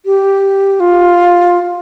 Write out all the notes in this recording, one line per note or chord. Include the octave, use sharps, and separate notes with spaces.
G4
F4